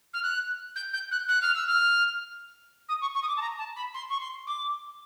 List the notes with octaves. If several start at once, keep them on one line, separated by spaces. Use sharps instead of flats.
F6
F#6
G6
G6
F#6
F#6
F6
E6
F6
D#6
C#6
C#6
D#6
D6
A5
A#5
A5
B5
C6
C#6
C6
D6